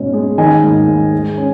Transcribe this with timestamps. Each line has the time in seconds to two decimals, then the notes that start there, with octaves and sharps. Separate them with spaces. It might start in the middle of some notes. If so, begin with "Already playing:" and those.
Already playing: G#2 B2 C#4
0.13 G#3
0.38 D#3 D#5 G#5
0.63 G#2
0.88 G#2
1.13 G#3
1.37 C#4